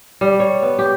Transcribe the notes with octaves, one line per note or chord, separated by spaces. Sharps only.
G3
C#5
B3
G4